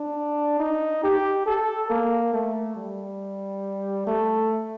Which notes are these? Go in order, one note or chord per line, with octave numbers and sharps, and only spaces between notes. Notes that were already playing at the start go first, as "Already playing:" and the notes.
Already playing: D4
D#4
G4
A4
A#3
A3
G3
A3